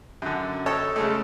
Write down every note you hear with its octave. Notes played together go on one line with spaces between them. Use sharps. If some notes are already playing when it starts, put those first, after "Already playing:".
F#2 D3
A4 C#5 D#5 G5 A5
C#3 G#3 A3